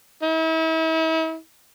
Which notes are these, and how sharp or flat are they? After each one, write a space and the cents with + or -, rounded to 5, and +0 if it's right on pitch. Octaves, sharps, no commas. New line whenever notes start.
E4 -40